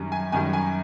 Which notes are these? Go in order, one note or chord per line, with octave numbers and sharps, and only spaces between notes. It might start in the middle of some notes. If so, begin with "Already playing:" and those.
Already playing: F#2 D#3 G3
G#5
F#2 D#3 G3 G#5
G#5